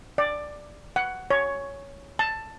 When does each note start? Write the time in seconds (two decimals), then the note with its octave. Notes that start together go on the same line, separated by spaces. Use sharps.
0.18 D5
0.96 F#5
1.30 C#5
2.19 A5